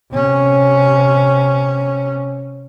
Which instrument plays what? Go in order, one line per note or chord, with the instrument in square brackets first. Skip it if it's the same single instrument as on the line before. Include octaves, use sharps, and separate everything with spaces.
[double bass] C3 C#4